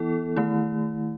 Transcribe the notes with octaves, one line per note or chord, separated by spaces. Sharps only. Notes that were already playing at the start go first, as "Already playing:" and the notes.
Already playing: E3 B3 E4 A4
D#3 A3 E4